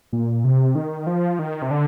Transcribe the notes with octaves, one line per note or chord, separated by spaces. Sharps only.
A#2
C3
D#3
F3
D#3
C3
D3